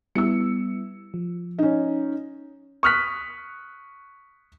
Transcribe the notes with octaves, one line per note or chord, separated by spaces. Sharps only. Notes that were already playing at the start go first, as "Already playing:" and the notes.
G3 B3 E4 E6 C#7
F3
C#4 D#4
C#6 D#6 F6 F#6 B6